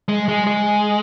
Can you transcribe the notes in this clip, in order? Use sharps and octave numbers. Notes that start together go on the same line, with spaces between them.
G#3
G#3
G#3